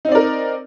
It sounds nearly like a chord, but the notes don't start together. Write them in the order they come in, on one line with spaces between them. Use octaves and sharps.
D#4 C4 D5 A#4